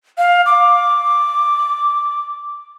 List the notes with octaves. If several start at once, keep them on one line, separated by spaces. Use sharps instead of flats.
F5
D6